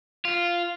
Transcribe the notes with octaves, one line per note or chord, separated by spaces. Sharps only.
F4